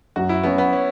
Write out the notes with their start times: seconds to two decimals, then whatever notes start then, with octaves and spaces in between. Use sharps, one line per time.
0.16 F#2 F#4
0.29 E4
0.43 F#3 B3 C#4 F#4 C#5
0.58 B3
0.73 C#4